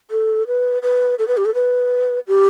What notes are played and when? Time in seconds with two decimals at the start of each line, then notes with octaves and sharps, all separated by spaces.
0.11 A4
0.47 B4
0.83 B4
1.19 A4
1.28 B4
1.37 G4
1.45 A4
1.55 B4
2.28 G4